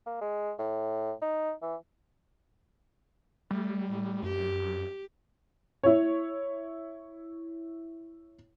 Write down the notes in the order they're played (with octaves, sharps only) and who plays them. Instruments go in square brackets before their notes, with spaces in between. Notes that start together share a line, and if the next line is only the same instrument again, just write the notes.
[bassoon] A#3
G#3
A2
D#4
E3
[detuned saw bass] G3 [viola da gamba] A3
[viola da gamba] A2
[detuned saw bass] F#2 [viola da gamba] G4
[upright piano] E4 C#5